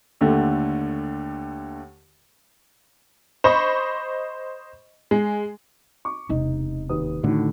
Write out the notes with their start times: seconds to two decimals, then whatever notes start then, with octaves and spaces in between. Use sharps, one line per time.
0.21 D#2 D3 A3
3.44 C5 D#5 B5 C#6
5.11 G#3
6.05 C#6 D6
6.29 E1 C3 D#4 D#5
6.89 D#2 B4 D#6
7.24 A2 D3 D#3 F#4